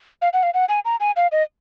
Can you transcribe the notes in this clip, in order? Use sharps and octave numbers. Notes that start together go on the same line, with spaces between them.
F5
F#5
F5
F#5
G#5
A#5
G#5
F5
D#5